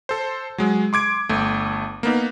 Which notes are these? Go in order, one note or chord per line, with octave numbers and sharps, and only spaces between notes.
A4 C5
F#3 G#3
C6 D6 G#6 D7
G1 A3
A#3 B3 D#4